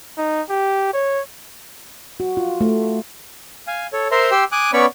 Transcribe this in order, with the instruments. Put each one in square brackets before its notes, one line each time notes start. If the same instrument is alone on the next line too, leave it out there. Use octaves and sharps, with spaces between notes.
[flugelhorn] D#4
G4
C#5
[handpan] F#4
F4
A3
[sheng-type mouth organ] F5 G#5
A4 C#5
A#4 C5 E5 A#5 C6
G4 G5 C6 E6
G#5 D6 D#6 F#6
B3 C#4 C#5 D5 B5 C#6